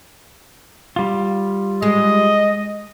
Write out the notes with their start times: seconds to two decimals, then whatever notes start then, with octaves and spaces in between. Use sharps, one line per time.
0.96 G3 F4
1.82 G#3 D#5